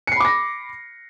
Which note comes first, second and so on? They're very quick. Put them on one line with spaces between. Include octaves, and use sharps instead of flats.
C#7 C7 B5 D6 A#6